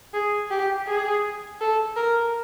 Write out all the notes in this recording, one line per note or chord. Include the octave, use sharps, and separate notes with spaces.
G#4
G4
G#4
A4
A#4